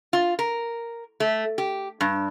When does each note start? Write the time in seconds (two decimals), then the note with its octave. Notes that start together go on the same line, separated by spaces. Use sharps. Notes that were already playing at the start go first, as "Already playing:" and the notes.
0.13 F4
0.39 A#4
1.20 A3
1.58 G4
2.01 G2